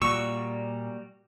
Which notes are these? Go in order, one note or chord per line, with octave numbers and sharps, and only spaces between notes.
A#2 G3 F#4 C#6 E6